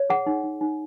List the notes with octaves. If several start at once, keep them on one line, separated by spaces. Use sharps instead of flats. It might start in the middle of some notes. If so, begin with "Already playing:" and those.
Already playing: C#5
G#4 F#5
D#4
D#4
D#4